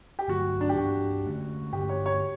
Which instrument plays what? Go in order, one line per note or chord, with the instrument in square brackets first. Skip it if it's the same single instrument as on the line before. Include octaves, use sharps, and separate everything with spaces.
[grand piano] G4
[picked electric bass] G2 D3 F#3 A3 [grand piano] F#4
[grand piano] D4
G4
[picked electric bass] G2 E3 B3 [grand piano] F#4
[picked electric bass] D3 A3 C#4
[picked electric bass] G2 D3 A3 C#4 [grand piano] G4
[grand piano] C#5
C#5